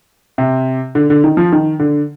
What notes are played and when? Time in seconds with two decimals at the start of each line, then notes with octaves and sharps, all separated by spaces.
0.38 C3
0.95 D3
1.10 D3
1.24 D#3
1.37 F3
1.52 D#3
1.79 D3